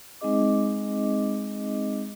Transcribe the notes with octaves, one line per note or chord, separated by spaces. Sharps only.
G#3 C4 D#4 G#4 D#5 D6